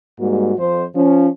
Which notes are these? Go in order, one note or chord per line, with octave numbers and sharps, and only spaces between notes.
G#2 G3 G#3 A#3 F#4
F2 C5
F3 C#4